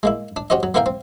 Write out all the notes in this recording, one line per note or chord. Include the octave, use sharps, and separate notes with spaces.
G#3 A#3 E4
D4
C#4 F#4 G4 C5 D#5
F#3
A#3 B3 E4 A#4 F5 G5
C4